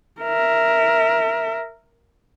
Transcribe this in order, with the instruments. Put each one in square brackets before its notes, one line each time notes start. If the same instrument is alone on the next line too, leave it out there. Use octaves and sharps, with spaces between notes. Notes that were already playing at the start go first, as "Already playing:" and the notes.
[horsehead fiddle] A#4 E5